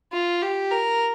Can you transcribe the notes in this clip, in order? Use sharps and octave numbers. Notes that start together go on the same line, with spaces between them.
F4
G4
A#4